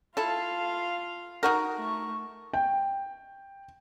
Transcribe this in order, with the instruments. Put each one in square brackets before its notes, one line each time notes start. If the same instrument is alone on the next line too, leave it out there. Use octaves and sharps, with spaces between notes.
[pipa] E4 A4 [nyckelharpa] F4 F5
[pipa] D#4 F#4 A#4
[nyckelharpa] A3 C#6
[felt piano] G5